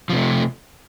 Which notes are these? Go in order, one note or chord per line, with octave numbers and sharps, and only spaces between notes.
C3 F3 A3